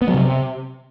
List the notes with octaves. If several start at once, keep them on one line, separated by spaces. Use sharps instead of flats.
B3
F#3
C3